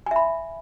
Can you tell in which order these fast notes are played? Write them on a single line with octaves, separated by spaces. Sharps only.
G#5 E5 B5